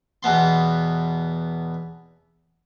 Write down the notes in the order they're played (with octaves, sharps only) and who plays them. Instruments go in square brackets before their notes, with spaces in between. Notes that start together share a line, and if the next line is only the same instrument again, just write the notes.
[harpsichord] E2 B2 B3 C6